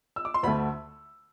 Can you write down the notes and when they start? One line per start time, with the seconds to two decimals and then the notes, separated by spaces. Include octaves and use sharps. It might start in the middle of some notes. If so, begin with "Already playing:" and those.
0.16 E6
0.25 D6
0.34 C6
0.43 D2 D3 A3 B5